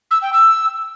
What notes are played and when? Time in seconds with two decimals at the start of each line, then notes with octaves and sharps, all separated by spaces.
0.11 E6
0.22 G5
0.33 E6